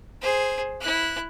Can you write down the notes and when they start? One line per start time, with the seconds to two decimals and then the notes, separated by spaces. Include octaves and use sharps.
0.22 G#4 C5
0.81 E4 F#6